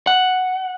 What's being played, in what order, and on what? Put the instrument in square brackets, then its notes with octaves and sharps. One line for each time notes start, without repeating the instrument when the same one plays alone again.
[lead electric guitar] F#5